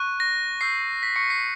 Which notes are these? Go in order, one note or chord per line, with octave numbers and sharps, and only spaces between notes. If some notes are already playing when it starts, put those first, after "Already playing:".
Already playing: C#6 F#6
A#6
C#6 E6 G6 C7
B6
C#6 C#7
C7